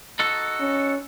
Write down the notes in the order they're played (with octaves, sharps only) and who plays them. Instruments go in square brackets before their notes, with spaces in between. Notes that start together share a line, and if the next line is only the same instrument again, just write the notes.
[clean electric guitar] D#4 F#4 A4
[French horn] C#4